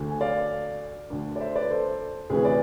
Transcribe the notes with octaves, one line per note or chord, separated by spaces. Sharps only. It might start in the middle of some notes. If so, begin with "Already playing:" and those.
Already playing: D2 D3
G#5
D5 F5
D2 D3
D5
C5 E5
B4 D5
A4 C5
D2 C3 E3 G#4 B4
B4 D5